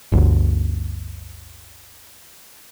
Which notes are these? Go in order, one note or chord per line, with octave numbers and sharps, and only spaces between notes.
G1 D2